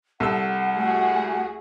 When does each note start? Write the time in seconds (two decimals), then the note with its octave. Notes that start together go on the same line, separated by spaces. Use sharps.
0.20 C2 A4 F#5 E6
0.75 A3 F#4 G#4